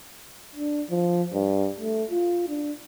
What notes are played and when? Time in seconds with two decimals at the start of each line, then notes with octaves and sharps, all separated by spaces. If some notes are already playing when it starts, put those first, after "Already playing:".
0.55 D4
0.90 F3
1.33 G2
1.80 A3
2.10 F4
2.48 D4